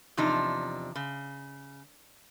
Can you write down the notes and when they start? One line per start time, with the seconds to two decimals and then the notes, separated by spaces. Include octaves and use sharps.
0.17 E2 C3 F3 D4 D#4
0.96 C#3